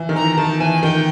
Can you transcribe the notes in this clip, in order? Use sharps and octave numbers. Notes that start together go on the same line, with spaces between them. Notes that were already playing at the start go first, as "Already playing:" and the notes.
Already playing: E3
D#3
E3 A#5
D#3 A5
E3 G#5
D#3 G5